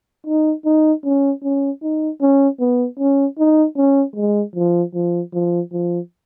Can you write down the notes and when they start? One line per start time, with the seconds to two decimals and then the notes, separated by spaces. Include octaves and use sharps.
0.27 D#4
0.66 D#4
1.05 C#4
1.44 C#4
1.83 D#4
2.21 C#4
2.60 B3
2.99 C#4
3.38 D#4
3.77 C#4
4.16 G#3
4.56 F3
4.94 F3
5.34 F3
5.72 F3